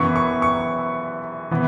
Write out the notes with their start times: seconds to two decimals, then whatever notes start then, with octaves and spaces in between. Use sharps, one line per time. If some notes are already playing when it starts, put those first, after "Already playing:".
Already playing: F#2 E3 B3 C#6
0.16 C#6
0.42 C#6
1.51 E3 B3